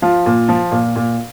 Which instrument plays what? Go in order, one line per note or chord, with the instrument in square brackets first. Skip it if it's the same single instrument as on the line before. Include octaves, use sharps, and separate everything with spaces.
[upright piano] F3 F4
A#2
F3
A#2
A#2